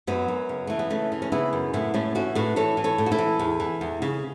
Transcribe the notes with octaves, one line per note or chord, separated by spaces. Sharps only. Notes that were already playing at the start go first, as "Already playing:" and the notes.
F#2 F#3 B3
F#2
C#3
E3 A3
B3
C#3 A3 C#4
E3
C#4
C#3 B3 E4
F#2
A2 B3 E4
A2 A3 C#4
E3 C#4 F#4
A2 F#4 B4
E3 A4 C#5
E3
A4 C#5
A2
F#4
E4 A4
E3
E2
E3
E2
C#3